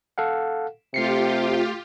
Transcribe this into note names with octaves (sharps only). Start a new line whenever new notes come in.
A4 F5 F#5
C3 A3 F4 G4 C7 C#7